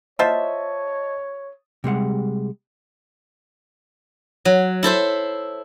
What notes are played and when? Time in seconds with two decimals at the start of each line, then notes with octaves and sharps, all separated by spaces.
0.19 F4 C5 C#5 D#5 E5 A5
1.84 C3 G3 G#3 F#5
4.45 F#3
4.83 E4 A4 C5 E5